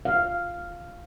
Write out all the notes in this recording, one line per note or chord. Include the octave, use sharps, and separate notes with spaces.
F5